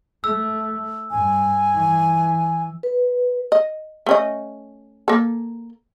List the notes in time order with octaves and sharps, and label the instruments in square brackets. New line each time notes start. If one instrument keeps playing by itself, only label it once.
[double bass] A3 [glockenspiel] E6
[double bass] G2 [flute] G#5
[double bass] E3
[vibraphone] B4
[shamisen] D#5
A3 C#4 D#5
A#3 A4